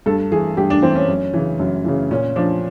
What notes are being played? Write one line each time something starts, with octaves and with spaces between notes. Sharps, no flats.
G2 A4
E3 G#4
G2 G4
D4
E3 C4
C#4
F#2
C#3 E3
F#2
C#3 E3
A#2 C#4
F3 D4